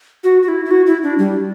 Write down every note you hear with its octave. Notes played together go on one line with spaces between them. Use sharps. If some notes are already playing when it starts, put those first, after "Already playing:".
F#4
F#4
E4
E4
F#4
E4
D4
G3